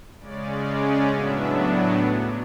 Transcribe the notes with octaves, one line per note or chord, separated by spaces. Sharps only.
C#3 G#3 C#4 D5
D5
D5
A2 F#3 B3 D4 E5